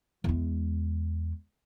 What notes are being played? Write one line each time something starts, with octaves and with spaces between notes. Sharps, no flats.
E2 G#3